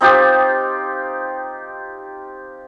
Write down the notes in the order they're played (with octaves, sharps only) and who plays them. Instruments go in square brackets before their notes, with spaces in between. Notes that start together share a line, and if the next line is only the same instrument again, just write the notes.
[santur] C4 D#4 F4 G4